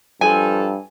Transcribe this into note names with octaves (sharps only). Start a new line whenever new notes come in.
G2 F3 A4 G#5